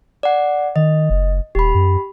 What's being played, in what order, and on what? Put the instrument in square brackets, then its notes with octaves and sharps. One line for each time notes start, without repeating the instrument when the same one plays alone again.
[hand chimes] D5 F#5
[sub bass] D#3 [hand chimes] D#5
[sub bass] F#1
[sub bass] D#1 [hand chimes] G4 B5
[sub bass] F#2